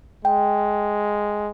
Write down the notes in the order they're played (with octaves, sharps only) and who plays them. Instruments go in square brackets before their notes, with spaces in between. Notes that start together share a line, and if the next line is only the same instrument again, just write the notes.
[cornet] G#3 [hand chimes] G5